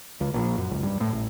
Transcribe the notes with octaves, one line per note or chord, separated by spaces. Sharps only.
C#2
A#1
F#2
C#2
G2
A2
A1